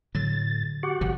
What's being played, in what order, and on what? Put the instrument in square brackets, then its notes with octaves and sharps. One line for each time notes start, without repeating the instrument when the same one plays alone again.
[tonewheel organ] A2 A6 [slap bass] D3 F#3
[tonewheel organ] F#4 G4 F#5
[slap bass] G1 C3 F3